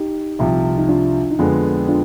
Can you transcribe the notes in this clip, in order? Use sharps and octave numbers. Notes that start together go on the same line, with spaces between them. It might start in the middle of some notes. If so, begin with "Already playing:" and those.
Already playing: D#4 G4
C2 C3 F3
D#4
D4 F4
D#4
F2 D3 G#3 B3 D4 F4
D4 F4